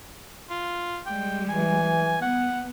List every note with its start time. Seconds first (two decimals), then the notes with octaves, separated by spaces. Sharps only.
0.50 F4
1.06 G3 G#3 G5
1.49 E3 G#5
2.22 B3 F#5